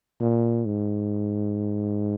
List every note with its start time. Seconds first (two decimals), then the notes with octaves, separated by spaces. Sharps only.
0.21 A#2
0.66 G#2